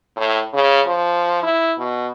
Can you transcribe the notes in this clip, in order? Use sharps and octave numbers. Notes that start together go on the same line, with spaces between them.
A2
C#3
F3
E4
B2